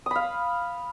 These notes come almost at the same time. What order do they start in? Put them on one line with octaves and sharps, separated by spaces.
D#6 B5 F5